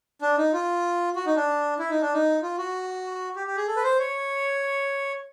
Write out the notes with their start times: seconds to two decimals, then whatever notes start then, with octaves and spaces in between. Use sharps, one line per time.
0.21 D4
0.38 D#4
0.53 F4
1.16 F#4
1.26 D#4
1.36 D4
1.79 E4
1.90 D#4
2.02 D4
2.13 D#4
2.42 F4
2.58 F#4
3.36 G4
3.47 G4
3.57 G#4
3.67 A4
3.76 B4
3.84 C5
3.99 C#5